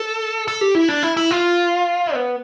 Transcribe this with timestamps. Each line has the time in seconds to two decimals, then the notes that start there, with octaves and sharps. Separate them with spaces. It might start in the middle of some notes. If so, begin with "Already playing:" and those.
Already playing: A4
0.48 A4
0.61 G4
0.75 E4
0.88 D4
1.03 E4
1.17 E4
1.31 F4
2.14 B3